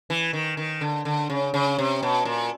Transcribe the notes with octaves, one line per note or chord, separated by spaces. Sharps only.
E3
D#3
D#3
D3
D3
C#3
C#3
C3
B2
A#2